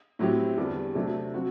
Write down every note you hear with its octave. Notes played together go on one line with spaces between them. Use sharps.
A2 F#3 C4 E4 G4
E2 D3 G3 D4
C3 F#3 A3 D4
F#3 C4 F#4